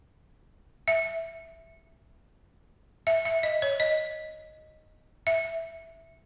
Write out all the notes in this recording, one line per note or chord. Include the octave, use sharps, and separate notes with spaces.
E5
E5
E5
D#5
C#5
D#5
E5